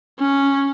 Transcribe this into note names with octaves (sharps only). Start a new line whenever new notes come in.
C#4